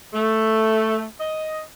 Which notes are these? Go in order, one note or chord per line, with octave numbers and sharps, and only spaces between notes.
A3
D#5